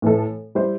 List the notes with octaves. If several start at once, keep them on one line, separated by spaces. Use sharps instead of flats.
A2 E3 A3 E4 A4
G3 E4 C5